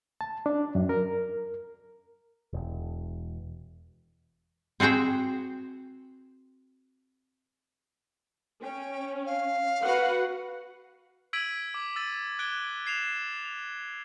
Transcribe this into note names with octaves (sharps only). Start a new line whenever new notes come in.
A5
D4
F#2
A#4
E1
C4 F#4 G#4 C5 G5
C#4 G5
F5
F#4 B4 F#5
E6 G#6 B6 D7 D#7 F#7
D6 D7
E6 A6 D#7
F#6 G#6 D7 G7
G#6 C7 E7 F7
F7